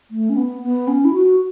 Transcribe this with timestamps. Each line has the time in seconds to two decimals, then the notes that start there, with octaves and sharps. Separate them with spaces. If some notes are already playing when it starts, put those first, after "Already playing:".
0.11 A3
0.29 C#4
0.37 B3
0.62 B3
0.88 C#4
1.05 E4
1.13 F#4